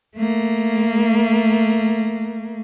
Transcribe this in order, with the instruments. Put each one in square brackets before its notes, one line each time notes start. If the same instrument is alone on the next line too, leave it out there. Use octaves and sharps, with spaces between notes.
[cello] A3 A#3